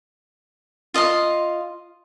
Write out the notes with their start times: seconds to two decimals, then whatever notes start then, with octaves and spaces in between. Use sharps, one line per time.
0.94 F4 D#5 F5 C6